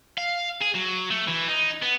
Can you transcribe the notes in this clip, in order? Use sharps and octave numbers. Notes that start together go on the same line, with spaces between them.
F5
G#4
F#3
A3
E3
D#4
B3